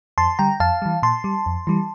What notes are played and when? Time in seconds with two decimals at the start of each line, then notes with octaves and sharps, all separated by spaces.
0.18 F2 A5 C6
0.39 D3 G3 G5 A#5
0.60 F2 F5 A5
0.82 E3 G3
1.02 A#2 A5 C6
1.24 G3
1.46 F2
1.67 E3 G3